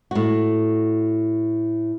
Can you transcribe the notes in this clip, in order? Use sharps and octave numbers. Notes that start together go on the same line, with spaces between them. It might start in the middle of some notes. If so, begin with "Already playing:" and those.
A2 F#4